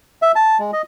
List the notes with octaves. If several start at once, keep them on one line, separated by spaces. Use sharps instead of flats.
E5
A5
G#3
D#5